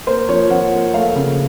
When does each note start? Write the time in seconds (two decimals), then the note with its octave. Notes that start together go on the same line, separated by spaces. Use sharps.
0.07 A#3 C5
0.29 F3 C#5
0.50 F3 F#5
0.72 A#3
0.94 A3 F5
1.15 C#3